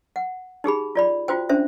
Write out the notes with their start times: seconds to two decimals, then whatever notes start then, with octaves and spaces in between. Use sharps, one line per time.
0.16 F#5
0.64 D#4 G4 G#4 B5
0.95 F4 D5 B5
1.28 F4 F#4 C5 G5
1.49 C#4 D4 C5 E5